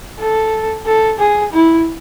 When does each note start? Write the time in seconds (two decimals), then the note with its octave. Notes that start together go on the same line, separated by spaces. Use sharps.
0.20 A4
0.86 A4
1.19 G#4
1.53 E4